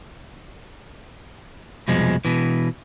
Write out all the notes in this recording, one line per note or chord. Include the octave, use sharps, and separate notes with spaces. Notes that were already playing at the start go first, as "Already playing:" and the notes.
C2 F2 B2 F3 G#3
B2 E3